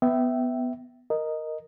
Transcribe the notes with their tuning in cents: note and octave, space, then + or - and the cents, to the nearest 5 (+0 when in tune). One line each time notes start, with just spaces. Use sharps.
B3 +10 E5 +0 G5 -25
A#4 +0 D#5 +0